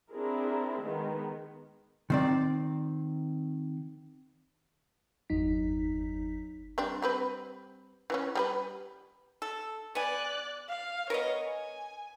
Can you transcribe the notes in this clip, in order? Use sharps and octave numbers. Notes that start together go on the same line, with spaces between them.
C4 D4 E4 G#4 A#4
D#3 G#3 B3
D#3 C4 D5
G1 E2 F#3 D#4 B6
G3 C4 D4
G3 C4 B4
E3 F3 C#4
G3 G4 B4
A4
B3 D5 G#5 F#6
F5
B3 A#4 B4 C#5 D#5
G#5